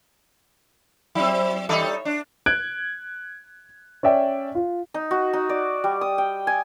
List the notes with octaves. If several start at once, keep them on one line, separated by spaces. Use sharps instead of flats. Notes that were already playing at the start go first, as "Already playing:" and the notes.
F#3 C4 E4
F#2 E3 G3 D#4 A4 D#5
C#5
D4
F#6 G#6 D7
C#4 D5 E5 G5
F4
D#4
F#4
D#4
D5
G3
D#6
G5
G#5